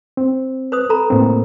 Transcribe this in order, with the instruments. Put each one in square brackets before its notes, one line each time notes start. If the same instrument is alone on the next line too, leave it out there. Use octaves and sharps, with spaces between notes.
[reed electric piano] C4
[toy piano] B4 C5 D#6
A4 A#5 B5
[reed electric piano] A2 A#3 C4